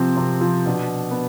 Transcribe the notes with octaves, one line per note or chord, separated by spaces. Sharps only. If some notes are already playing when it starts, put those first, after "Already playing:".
Already playing: C3 F3 C4
C3 C4
F3
B2 D4
B3